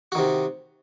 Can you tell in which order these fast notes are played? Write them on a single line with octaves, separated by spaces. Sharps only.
F#4 D#3 C3